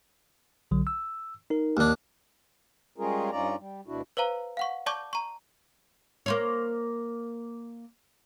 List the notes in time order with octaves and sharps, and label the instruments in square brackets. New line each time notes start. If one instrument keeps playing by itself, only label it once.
[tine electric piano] B1 D3 F#3
E6
D#4 A#4
[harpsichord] D#2 D4
[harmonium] G3 G#3 C#4 F4 G#4 A#4
G2 C#4 D#4 F4 D5 A#5
G3
D2 B2 D4 E4 F#4
[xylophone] B4 C5 F5 A#5
F5 F#5 C#6
D5 A5 C#6 D6 G6
A#5 C#6
[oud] A#3 C5 C#5